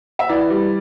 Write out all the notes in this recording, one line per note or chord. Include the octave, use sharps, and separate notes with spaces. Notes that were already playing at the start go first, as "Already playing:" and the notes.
E5
E3 D5
G3